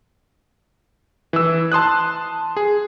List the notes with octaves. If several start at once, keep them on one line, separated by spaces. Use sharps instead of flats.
E3 E6
A5 C6 D#6 F#6
G#4